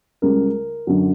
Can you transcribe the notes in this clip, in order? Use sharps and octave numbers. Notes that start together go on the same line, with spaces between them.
C#2 C#3 G3 A#4
F#2 D3 F#3